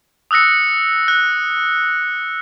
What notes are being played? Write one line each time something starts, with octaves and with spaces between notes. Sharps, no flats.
D#6 E6 F#6 A#6 C#7
F#6